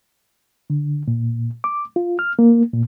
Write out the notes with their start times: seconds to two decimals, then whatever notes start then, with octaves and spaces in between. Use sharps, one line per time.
0.70 D3
1.08 A#2
1.64 D6
1.96 F4
2.19 F6
2.39 A#3
2.73 A#2